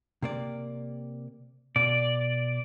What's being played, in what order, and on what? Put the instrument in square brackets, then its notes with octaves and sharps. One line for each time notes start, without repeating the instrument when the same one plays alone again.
[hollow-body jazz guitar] C3 A#3 D5
[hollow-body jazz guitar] B2 [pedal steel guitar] D5